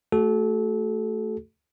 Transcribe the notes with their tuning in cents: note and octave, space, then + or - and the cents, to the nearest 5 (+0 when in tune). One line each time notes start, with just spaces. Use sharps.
A3 +0 F#4 +25 A4 -25